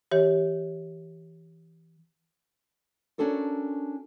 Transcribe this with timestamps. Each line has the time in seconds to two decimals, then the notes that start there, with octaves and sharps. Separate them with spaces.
0.11 E3 G4 C#5
3.18 C#4 D4 F#4 A4 A#4